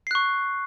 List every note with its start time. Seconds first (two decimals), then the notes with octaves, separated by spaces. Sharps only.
0.07 C7
0.11 F#6
0.15 C#6